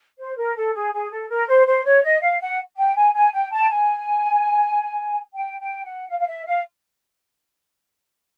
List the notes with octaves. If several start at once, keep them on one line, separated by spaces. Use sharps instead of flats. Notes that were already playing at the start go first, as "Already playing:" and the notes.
C5
A#4
A4
G#4
G#4
A4
A#4
C5
C5
C#5
D#5
F5
F#5
G5
G#5
G#5
G5
A5
G5
G#5
G5
G5
F#5
F5
F5
E5
F5